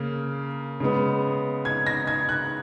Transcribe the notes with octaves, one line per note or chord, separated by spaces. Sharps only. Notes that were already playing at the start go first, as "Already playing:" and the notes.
Already playing: C#3 A#3
C#3 G#3 B3
G#6
A#6
G#6
F#6